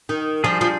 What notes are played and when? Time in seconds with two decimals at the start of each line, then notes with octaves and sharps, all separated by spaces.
0.09 D#3
0.44 F3 G3 D4 F4 G#4
0.61 F3